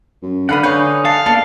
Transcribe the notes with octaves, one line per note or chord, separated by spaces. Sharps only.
F#2
D3 B4 D5 F5 F#5 B5 D#6
D3 D#4 B4 C#5 F5 G#5 G6
A4 F5 A5
A#3 B3 D4 A4